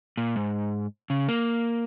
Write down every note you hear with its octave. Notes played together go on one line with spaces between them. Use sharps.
A#2
G#2
C#3
A#3